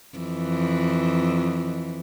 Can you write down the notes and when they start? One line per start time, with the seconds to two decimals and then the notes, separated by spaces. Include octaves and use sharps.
0.18 F2 E3